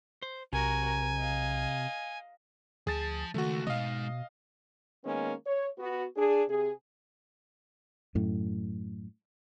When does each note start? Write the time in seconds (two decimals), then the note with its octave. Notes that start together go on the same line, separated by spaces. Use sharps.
0.22 C5
0.53 B1 C3 F#4 A#4 G#5
0.85 A#4
1.17 D#5 F5
2.87 D2 F3 G#4 A5 A6
3.34 C#2 D#3 A3 F#4
3.67 B2 G#3 D#4 D#5 F5
5.04 D#3 G#3 A#3 B3 C#4
5.46 C#5
5.78 B3 F#4
6.17 D4 G#4
6.48 C3 G#4
8.15 F#2 A2